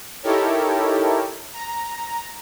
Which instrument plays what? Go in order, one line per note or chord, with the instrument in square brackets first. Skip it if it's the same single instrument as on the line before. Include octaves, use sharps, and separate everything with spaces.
[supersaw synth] D#4 E4 G4 A4 A#4 C#5
A#5